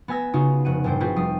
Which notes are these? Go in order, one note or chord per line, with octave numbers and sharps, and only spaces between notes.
B3 B4 G#5 E6 A#6
C#3 D#4 F4 F#4
F1 F#5 D#7
G1 A#2 G3 C5 D7
C4 F4 F#4 G#4 B4
F1 G3 D#6 C7